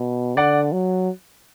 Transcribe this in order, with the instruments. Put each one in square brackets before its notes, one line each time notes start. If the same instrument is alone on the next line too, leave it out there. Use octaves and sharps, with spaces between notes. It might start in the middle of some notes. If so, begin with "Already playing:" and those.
Already playing: [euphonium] B2
[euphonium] D3 [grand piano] D5 F#5
[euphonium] F#3